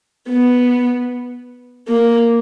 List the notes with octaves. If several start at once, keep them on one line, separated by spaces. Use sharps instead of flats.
B3
A#3